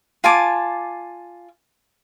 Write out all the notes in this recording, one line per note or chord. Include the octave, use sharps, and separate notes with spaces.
F4 G#5 A5 D6